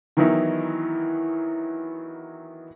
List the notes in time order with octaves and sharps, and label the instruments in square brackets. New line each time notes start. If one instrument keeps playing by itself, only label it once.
[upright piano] D#3 E3 F#3 B3 D#4 E4